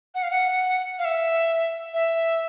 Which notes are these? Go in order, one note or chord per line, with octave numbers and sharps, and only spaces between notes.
F#5
F5
F#5
F5
E5
E5